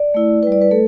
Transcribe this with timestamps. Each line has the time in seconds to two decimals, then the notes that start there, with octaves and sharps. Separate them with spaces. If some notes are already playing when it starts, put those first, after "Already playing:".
Already playing: D5
0.14 A3 E4
0.42 G3 E4 B4
0.52 D5
0.62 B4
0.71 A3 A4